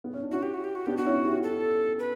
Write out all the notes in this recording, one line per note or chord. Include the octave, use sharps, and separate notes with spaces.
B3
C#4
D4
C#4 E4 F#4
G4
F#4
G4
F#4
B3 D4 G4
F#4
C#4 E4
E4 G4
A4
B4